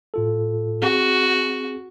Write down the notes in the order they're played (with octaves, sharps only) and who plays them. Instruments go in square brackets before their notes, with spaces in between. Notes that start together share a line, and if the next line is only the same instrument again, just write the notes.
[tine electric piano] A2 F4 A4
[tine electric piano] C4 G#4 [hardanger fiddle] F#4